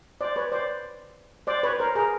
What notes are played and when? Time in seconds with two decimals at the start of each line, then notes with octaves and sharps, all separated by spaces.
0.21 C5 D5
0.36 B4 C#5
0.52 C5 D5
1.47 C5 D5
1.63 B4 C#5
1.79 A#4 C5
1.95 G#4 A#4